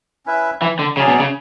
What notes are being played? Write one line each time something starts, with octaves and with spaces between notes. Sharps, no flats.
C#4 E4 B4 E5
E3
D3
C#3 F#3 C#4 G#4 D5
B2
C#3